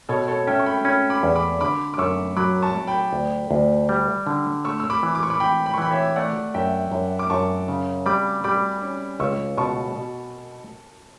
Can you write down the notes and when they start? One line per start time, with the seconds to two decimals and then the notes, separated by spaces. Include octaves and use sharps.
0.09 B2 A4 C#5
0.28 A4 C#5
0.47 C#4 E5 G5
0.59 C#6
0.66 G5 B5
0.85 C#4 G5 B5
1.10 B5 D6
1.23 E2
1.36 B5 D6
1.60 D3 B5 D6
1.94 D6
1.98 F#2 C#6 E6
2.37 F#3 B5 D6
2.62 A5 C#6
2.75 F#3
2.87 G5 B5
3.13 D2
3.51 D2
3.89 G3
4.27 D3
4.65 A3 C#6 E6
4.80 E6
4.90 B5 D6
5.03 E3
5.15 D6
5.23 C#6
5.30 B5 D6
5.40 E3 G5 B5
5.66 B5
5.74 C#6
5.78 E3 G5 B5
5.91 C#5 E5
6.16 A3 D5 F#5
6.54 F#2 E5 G5
6.92 F#2
7.19 D6
7.30 F#2 A5 C#6
7.68 C#3
8.06 G3 B5 D6
8.44 G3 B5 D6
8.82 C#4
9.20 C#2 C#6 E6
9.58 B2 A5 C#6
9.96 B2